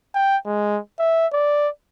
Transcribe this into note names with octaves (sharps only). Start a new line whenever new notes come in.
G5
G#3
E5
D5